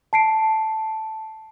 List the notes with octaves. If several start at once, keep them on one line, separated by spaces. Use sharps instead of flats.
A5 C7 D7